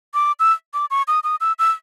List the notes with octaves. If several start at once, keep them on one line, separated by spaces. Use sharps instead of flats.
D6
E6
D6
C#6
D#6
D#6
E6
E6